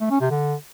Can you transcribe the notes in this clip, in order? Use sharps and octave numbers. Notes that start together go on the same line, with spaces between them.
A3
C#4
C3
D3